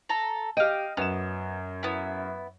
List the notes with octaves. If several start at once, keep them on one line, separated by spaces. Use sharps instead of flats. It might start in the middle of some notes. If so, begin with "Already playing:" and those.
A4 A#5
G4 D#5 F5 G5 D#7
F#2 B3 E7
B3 E4